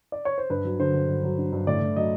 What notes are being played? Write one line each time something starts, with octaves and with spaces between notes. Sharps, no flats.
D5
C#5
C5
G2 B4
F#3
D3 C5
G2
G2
F#3
D3
G2
A2 D5
A2
F#3 D#5